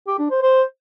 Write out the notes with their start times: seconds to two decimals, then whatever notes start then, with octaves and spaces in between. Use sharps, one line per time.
0.08 G4
0.19 D4
0.31 C5
0.42 C5